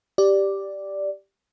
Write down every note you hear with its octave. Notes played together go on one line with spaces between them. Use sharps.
G4 D5